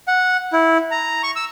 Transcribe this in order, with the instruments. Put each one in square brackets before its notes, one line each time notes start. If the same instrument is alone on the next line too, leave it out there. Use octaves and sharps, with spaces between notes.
[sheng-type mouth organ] F#5
E4
A#5
C#6
E6